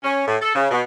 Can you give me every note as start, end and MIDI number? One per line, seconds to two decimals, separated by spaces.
0.04 0.23 61
0.27 0.36 45
0.41 0.55 69
0.55 0.68 49
0.71 0.82 47